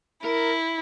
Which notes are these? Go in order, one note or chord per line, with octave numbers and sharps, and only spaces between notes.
E4 A#4